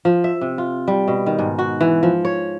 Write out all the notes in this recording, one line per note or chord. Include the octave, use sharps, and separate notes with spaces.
F3
E5
C3
F4
G3
B2
D#3
G#2
F#4
E3
F3
C#5